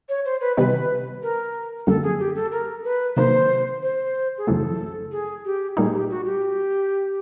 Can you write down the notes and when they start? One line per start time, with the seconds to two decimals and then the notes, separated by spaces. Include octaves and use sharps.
0.09 C#5
0.25 C5
0.41 B4
0.57 C3 D#3 G3 B3 D#4 B4
1.23 A#4
1.87 F#2 D3 G3 A#3 A4
2.03 G#4
2.19 G4
2.35 A4
2.52 A#4
2.84 B4
3.17 C3 D#3 F#3 A#3 C5
3.83 C5
4.38 G#4
4.47 F#2 C#3 E3 A3 A4
5.12 G#4
5.45 G4
5.77 A#2 G3 A#3 D#4 G#4
5.93 G4
6.10 F#4
6.26 G4